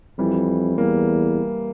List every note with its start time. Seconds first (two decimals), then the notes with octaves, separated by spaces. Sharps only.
0.18 F2 E3 G3
0.78 E2 G3 A#3